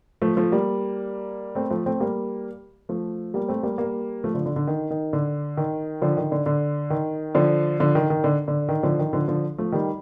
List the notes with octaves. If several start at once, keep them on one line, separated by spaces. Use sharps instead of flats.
F3 A3
F3 A3
G3 A#3
A3 C4
F3 A3
A3 C4
G3 A#3
F3 A3
G3 A#3
A3 C4
G3 A#3
G3 A#3
F3 A3
D3 F3
D3
D3
D#3
D#3
D3
D#3
D3 F3
D#3
D3
D3
D#3
D3 F3
D3 F3
D#3
D#3
D3
D3
D#3
D3 F3
D#3
D3 F3
D3 F3
F3 A3
D#3 G3